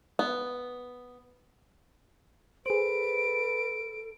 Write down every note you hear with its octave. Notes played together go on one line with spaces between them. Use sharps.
B3
G#4 A4 B4 C5 D7